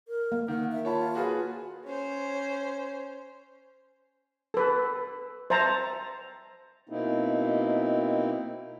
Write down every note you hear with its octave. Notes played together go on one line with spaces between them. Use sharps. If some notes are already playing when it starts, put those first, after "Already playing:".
A#4
A#3
D#3 F#5
E5
F4 C#5 A5 B5
F#4 G#4 B4
C#4 C5
A4 B4
C5 E5 A5 A#5
B2 A#3 C4 D#4 E4